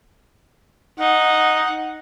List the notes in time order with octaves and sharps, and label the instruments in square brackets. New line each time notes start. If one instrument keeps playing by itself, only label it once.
[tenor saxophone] D#4 [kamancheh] F#5